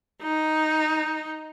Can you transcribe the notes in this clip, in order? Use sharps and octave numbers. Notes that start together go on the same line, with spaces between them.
D#4